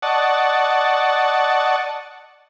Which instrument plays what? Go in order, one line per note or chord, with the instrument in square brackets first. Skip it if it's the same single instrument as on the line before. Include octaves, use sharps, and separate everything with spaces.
[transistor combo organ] D5 D#5 F#5 A5 C#6